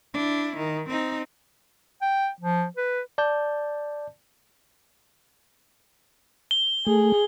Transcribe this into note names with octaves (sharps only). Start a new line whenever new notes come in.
D4 E4
D#3
C4 D#4
G5
F3
B4
D5 A5 G6
G7
A3 G#4